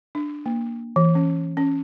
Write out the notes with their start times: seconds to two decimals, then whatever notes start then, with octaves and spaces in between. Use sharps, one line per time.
0.15 D4
0.46 A#3
0.96 E3
1.15 C#4
1.57 C#4